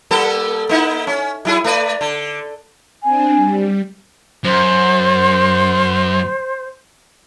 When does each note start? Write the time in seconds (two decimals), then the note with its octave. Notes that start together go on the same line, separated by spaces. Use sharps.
0.11 G3 A#3 A4
0.69 A#3 D#4 E4
1.07 C#4
1.45 F#3 E4 G#4
1.64 A3 B4 D5
2.01 D3
3.04 C4 D4 G#5
3.36 G3
4.44 F#2 C5